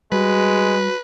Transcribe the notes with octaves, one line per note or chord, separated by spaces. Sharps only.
G3 G#3 F#4 B4